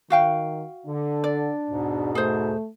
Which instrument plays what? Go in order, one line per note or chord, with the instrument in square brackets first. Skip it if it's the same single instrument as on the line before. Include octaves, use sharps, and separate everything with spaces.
[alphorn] D#3 [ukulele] F#4 F5 G5
[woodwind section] D3 [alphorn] D4
[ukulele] D5
[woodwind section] E2 G#2 B2
[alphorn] A3 [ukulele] G#4 C5